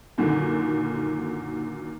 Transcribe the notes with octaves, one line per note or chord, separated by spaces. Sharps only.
F#2 A#2 D3 D#3